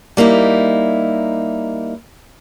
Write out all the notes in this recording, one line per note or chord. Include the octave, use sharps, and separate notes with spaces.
G3 A#3 D#4 E4